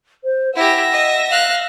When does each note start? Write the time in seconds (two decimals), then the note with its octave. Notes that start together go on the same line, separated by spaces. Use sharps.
0.24 C5
0.56 E4 G4 E5 F#5 A#6
0.92 D#5
1.30 F5 F#6